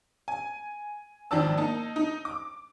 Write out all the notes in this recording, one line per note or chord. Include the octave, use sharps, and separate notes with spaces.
G#5
G#1 D#3 F3 D5 A5 E6
A#3 D#4 A5
D#4
D6